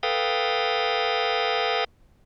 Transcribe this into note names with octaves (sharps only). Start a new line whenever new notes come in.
A4 B4 F5 G5 D#6